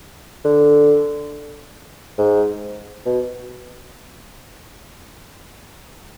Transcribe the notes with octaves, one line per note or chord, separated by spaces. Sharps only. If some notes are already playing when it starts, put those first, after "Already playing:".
D3
G#2
B2